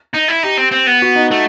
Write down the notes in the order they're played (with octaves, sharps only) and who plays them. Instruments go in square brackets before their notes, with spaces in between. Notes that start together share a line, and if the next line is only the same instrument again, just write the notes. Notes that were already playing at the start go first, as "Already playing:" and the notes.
[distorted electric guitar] D#4
E4
[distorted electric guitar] D#4 [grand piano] G4
[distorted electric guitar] C4
C4
B3
[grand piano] F#4
D#4
[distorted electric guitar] A3 [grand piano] F#4